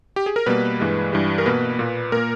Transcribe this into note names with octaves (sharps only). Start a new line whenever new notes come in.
G4
G#4
A#4
B2 G3 A#3 B4
G2 E3 G#3
G2 E3 G3
A#4
B2 A#3 B4
A#2 A#3
A#2 A#3 A#4